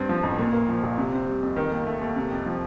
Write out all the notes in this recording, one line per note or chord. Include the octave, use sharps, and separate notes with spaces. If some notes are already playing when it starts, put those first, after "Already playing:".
Already playing: G2 C4
F3
A1
A#2
A#3
F3
A#1
C3
C4
G3
F2
D#3
D#2
A3
D#2
C3
F2
F3